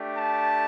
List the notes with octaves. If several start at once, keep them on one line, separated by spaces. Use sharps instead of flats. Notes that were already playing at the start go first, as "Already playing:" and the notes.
Already playing: A3 D4 G4
A5